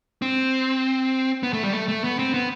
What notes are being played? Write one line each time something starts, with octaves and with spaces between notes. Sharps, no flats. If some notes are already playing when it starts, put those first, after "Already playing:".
C4
B3
A3
G3
A3
A3
B3
C4
B3